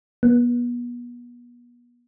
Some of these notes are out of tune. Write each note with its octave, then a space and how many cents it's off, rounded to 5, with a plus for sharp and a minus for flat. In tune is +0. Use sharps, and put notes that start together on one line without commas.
B3 -35